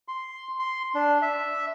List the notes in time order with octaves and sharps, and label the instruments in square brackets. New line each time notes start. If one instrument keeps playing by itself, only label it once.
[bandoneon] C6
C6
D4
E5